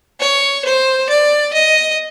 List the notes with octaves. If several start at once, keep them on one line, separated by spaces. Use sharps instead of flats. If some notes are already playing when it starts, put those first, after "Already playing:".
C#5
C5
D5
D#5